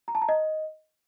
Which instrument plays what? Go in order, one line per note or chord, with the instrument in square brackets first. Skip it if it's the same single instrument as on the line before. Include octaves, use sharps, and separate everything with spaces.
[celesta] A#5
A5
A#5
D#5